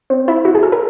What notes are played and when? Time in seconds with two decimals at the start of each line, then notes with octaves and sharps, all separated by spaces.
0.10 C4
0.28 E4
0.45 F#4
0.55 G#4
0.63 A4
0.72 A#4